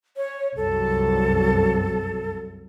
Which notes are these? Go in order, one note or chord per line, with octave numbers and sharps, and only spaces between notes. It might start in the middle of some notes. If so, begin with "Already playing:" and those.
C#5
C2 F#2 A4